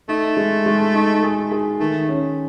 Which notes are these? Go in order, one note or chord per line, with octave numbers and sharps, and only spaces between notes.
A3 D#4
G#3
G#3
D#4
G#4
G#4
D#3 A3
C#4